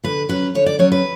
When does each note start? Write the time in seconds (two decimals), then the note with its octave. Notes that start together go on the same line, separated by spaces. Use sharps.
0.04 D3 B4
0.29 F#3 C#4 B4
0.55 D3 C#5
0.66 D5
0.79 F#3 C#4 C#5
0.92 B4